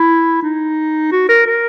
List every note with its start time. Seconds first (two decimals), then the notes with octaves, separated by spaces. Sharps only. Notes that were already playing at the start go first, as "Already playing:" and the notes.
Already playing: E4
0.42 D#4
1.12 F#4
1.29 A#4
1.46 A#4